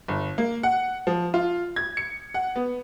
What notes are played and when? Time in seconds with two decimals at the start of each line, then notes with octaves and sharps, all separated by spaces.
0.08 G1
0.38 A#3
0.63 F#5
1.07 F3
1.34 F4
1.76 G#6
1.97 C#7
2.34 F#5
2.56 B3